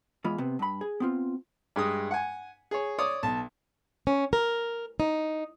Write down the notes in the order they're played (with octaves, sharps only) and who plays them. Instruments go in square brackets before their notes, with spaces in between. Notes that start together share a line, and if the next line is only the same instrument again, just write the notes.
[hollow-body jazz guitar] E2 G#3 F4 B5
C3 B3
G2 B5
G#4
B3 C4 F4
[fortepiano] G2 G#3 D#6
F#5 G#5
G#4 C#5
C#5 D5 D#6
B1 A5
[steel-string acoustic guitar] C#4
A#4
D#4